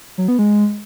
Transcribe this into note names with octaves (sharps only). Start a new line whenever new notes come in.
F#3
B3
G#3